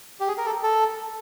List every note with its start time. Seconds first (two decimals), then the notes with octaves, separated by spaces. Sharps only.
0.20 G4
0.28 G#4
0.38 A#4
0.46 A4
0.63 A4